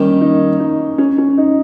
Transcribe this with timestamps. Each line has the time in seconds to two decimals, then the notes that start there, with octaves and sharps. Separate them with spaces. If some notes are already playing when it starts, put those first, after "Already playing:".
Already playing: D#3 G3 A#3 C#4
0.21 D#4
0.60 D#4
0.98 C#4
1.18 C#4
1.38 D#4